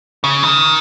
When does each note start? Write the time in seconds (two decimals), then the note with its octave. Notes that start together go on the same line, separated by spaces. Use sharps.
0.24 C#3
0.43 D#3